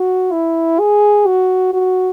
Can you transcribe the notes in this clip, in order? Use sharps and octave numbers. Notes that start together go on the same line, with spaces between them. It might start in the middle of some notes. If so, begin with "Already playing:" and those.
Already playing: F#4
E4
G#4
F#4
F#4